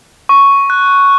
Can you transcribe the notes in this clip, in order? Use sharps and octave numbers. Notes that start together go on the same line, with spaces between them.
C#6
F#6